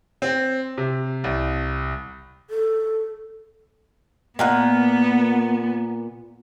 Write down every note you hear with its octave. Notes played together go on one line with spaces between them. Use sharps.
C4
C3
C2
A4
A#2 A#3 B3 F#5